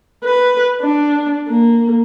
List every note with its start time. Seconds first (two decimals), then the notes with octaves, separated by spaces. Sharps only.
0.24 B4
0.82 D4
1.48 A#3